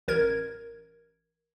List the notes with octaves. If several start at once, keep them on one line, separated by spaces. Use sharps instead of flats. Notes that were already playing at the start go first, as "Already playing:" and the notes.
A1 A#4 G#6